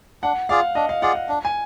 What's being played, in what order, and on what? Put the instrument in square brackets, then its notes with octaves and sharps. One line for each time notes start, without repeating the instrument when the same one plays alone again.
[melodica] D4 [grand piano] F#5
[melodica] F4 G#4 D5 [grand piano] F5
[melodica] D4 [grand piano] D#5
[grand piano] F5
[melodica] F4 G#4 D5 [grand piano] F#5
[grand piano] F#5
[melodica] D4
[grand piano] G#5